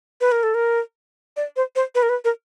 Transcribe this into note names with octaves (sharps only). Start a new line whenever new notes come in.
B4
A#4
A4
A#4
D5
C5
C5
B4
A#4
B4
A#4